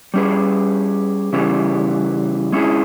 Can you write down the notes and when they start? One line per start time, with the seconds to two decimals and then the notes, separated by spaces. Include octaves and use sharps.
0.14 G3 C#4 G#4 B4
1.33 C#3 E3 G3 C#4
2.52 G#3 C#4 E4 G#4